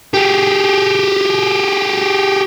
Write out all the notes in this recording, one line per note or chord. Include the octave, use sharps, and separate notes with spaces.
G4 G#4